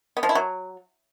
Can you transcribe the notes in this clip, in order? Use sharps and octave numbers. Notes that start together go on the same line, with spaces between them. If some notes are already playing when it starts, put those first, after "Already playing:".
B3
F3
E4
F#3